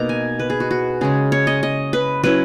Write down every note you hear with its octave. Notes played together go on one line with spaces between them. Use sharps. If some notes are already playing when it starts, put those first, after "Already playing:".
Already playing: B2 A#3 D#4 A#5
G#5
B4
G#4
F#4
F#4
C#3 G#3 C#4 G#4
C#5
D#5
D#5
B4
F#3 C#4 E4 B4